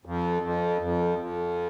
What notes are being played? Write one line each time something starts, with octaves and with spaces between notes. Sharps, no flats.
F2
F2
F2
F2